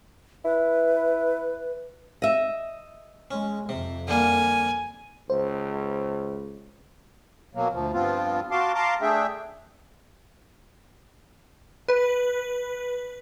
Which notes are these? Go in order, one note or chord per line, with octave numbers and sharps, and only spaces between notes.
E4 B4
D#5 E5
G#3 C#4
F2 C3
D3 G3 A#3 G#5
C#2 C5
B2 F#3 A#3
D2 F3
G2 F3 B3 C4 F4
F#4 F5 A5 C6 D6
F5 A5 A#5 C6 D6
A3 D4 G#4 E5 G5
B4